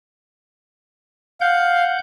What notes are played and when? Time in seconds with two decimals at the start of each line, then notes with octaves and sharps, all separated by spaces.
1.41 F5 F#5 G6